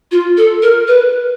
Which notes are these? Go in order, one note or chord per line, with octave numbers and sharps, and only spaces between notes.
F4
A4
A#4
B4